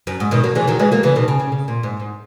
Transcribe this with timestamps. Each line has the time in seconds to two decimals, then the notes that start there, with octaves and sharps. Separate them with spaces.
0.07 F#2
0.20 G#2
0.31 B2 D#3
0.43 F#3 A#3
0.55 E3 G#3
0.68 D#3 F#3
0.79 E3 G#3
0.92 F#3 A#3
1.03 C#3 E3
1.15 B2 D#3
1.28 C#3
1.40 C#3
1.52 C#3
1.68 A#2
1.83 G#2
2.00 G#2